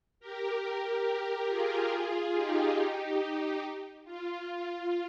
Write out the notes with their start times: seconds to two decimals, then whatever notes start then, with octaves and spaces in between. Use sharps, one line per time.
0.20 G4 A#4
1.05 G4 A#4
1.48 F4 G#4
2.34 D#4 G4
4.05 F4
4.47 F4